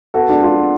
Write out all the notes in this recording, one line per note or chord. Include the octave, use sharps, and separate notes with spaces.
B3 F#4 A4
G#3 D4 F#4
B3 F4
B3